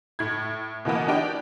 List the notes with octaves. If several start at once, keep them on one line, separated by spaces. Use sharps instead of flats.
A2 G#6
B2 E3 A#3 B3
D4 G4 G5